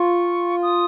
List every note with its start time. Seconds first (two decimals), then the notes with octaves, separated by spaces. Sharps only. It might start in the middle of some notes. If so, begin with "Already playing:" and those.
Already playing: F4 C#6
0.63 D#6